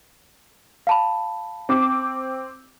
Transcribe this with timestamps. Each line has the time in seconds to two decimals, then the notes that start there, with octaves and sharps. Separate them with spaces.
0.87 F5 A5 B5
1.69 C4 D6